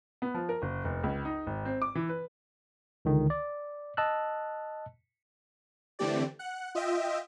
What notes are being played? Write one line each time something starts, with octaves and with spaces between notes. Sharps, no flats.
B3
F3
A#4
F#1
F1
C#2
D#4
G#1
C4
D6
E3
B4
C#2 D3 D#3
D5
D#5 A5 E6 F#6
D3 E3 A3 C4 G4 D5
F#5 F#6
F4 D#5 E5 G5